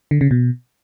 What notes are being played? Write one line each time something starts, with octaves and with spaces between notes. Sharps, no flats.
D3
C#3
B2